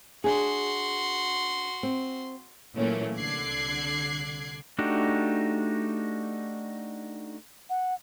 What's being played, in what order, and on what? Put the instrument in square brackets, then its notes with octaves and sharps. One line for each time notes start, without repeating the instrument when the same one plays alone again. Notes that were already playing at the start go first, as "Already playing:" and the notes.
[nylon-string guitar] D4 G#4 [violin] F#4 C6
[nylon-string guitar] C4
[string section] A#2 E3 F#3 A3 A#3 C#4
C2 D3 D6 F#6 G#6 C7
[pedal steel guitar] A3 D4 D#4 F#4 G4
[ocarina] F#5